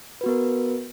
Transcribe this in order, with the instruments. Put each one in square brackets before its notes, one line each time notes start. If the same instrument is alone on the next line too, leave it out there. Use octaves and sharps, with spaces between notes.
[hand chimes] B4
F#4
B3
A#4